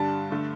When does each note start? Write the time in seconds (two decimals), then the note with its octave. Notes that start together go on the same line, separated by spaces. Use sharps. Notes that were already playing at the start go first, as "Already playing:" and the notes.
Already playing: G2 D3 G3 A5
0.30 G2 D3 A3